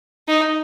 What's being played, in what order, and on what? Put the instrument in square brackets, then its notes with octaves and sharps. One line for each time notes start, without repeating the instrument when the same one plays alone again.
[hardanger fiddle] D#4